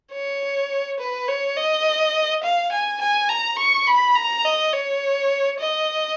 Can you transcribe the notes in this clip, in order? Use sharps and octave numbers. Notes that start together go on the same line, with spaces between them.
C#5
B4
C#5
D#5
F5
G#5
G#5
A#5
C#6
B5
A#5
D#5
C#5
D#5